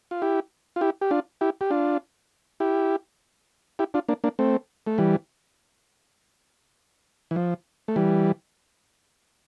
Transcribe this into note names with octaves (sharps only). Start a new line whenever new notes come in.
F4
E4 G4
F4
E4 G4
G4
D4 F4
E4 G4
G4
D4 F4
E4 G4
E4 G4
D4 F4
A#3 D4
A#3 D4
A3 C4
A3
E3 G3
E3
F3
A3
E3 G3